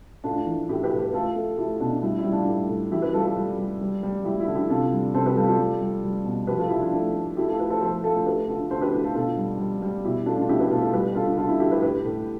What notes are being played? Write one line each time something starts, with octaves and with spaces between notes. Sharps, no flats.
A2 D4 F4
E3
A2 E4 G4
G4 B4
A2
G4 B4
A3 F4 A4
A3
A3 E4 G4
B2 D4
G3 E4
E4
G3
D4 F4
A2
A2
E3 E4 G4
G4 B4
G3 F4 A4
F4 A4
G3
G3
G3
G3
G3 E4 G4
E4
D3
E4 G4
C3 F4 A4
G3
C3 A4 C5
G4 B4
G3 F4 A4
F4 A4
G3
G3
G3
B2
F3 G4 B4
F4 A4
F3 E4 G4
D4 F4
A3
A3
A3 E4 G4
F4 A4
A3 G4 B4
A4 C5
F3 A4 C5
A3 F4 A4
D4 F4
A3 G4 B4
D3 F4 A4
D3 A4 C5
G4 B4
D3 E4 G4
F4 A4
B2 F4 A4
G3
G3
G3
B2 E4 G4
A3 D4 F4
D4 F4
B2 E4 G4
G4 B4
B2 F4 A4
F4 A4
G3 G4 B4
D3 F4 A4
D3 F4 A4
E4
D3 E4 G4
G4 B4
A2 G4 B4
A2